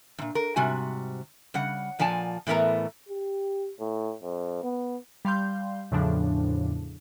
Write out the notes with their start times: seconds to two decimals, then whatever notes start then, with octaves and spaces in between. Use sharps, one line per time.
0.18 F#2 A#2
0.35 A#4
0.56 G#2 C3 G3 F#4 G#5
1.54 C#3 G3 F#5
1.99 A#2 F3 D5 G#5 A5
2.47 A2 E3 A3 B3 A#4 A#5
3.09 G4
3.80 A2
4.23 F2
4.64 B3
5.25 G3 F5 C6 G6
5.91 E2 A2 C#3 F3 D4